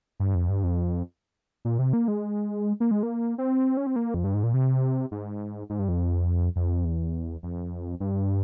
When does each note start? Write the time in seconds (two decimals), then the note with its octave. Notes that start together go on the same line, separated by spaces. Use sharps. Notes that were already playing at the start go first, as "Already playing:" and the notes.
0.20 G2
0.35 F2
0.49 G2
0.64 F2
1.65 A#2
1.79 C3
1.93 A#3
2.08 G#3
2.80 A#3
2.91 G#3
3.03 A#3
3.38 C4
3.77 C#4
3.87 C4
3.96 A#3
4.14 F2
4.24 G2
4.34 G#2
4.43 A#2
4.54 C3
5.11 G#2
5.70 G#2
5.79 G2
5.89 F2
6.56 F2
6.85 E2
7.43 F2
8.00 G2